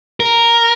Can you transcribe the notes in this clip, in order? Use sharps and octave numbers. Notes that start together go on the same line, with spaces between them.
A#4